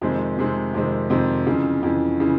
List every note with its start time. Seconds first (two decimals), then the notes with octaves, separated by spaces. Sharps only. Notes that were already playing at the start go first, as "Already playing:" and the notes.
0.01 F2 C3 D#3 G#3 C4
0.37 F2 C3 D#3 G#3 C4
0.74 F2 C3 D#3 G#3 C4
1.10 F2 C3 D#3 G#3 C4
1.47 F2 C#3 E3
1.83 F2 C#3 E3
2.20 C#3 E3